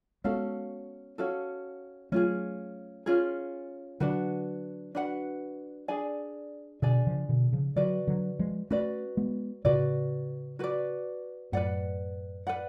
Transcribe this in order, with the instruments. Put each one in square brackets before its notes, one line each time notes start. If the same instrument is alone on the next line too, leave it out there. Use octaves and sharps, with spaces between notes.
[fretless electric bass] G#3 B3 [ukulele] C#4 F#4 A4 F5
[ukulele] C#4 F#4 A4 F5
[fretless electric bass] F#3 A3 [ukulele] C#4 F4 G#4
[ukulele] C#4 F4 G#4
[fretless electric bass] D3 F#3 [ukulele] D4 F#4 B4 F#5
[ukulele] D4 F#4 B4 F#5
D4 G#4 D5 G#5
[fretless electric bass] B2 D3 [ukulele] D4 G#4 D5 G#5
[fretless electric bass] C#3 F3
B2 D3
C#3 F3
[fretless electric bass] D3 F#3 [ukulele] F#4 B4 D5
[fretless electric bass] D3 F#3
F3 G#3
[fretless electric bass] A3 C#4 [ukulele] F#4 B4 D5
[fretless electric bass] G#3 B3
[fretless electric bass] A2 C#3 [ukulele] F#4 B4 D5
[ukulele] F#4 B4 D5
[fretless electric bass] F#2 A2 [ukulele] B4 D5 F#5
[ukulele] B4 D5 F#5